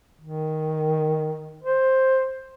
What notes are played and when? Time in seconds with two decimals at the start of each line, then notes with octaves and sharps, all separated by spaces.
0.21 D#3
1.62 C5